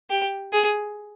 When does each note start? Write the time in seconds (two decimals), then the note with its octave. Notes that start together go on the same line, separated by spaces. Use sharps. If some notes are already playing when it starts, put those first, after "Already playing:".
0.10 G4
0.53 G#4